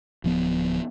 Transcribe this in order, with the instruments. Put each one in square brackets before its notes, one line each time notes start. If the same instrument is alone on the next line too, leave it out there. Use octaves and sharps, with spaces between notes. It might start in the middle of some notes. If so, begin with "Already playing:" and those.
[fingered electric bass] D1 F3 B3